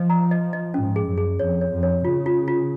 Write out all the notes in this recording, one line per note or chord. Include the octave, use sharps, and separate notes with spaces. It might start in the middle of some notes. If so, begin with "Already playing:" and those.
Already playing: F3 D#5
A#5
D#5
D#5
G#2 C#4
G#4
F#2
G#4
F2 C#5
C#5
F2
C#5
C#3 F4
F4
F4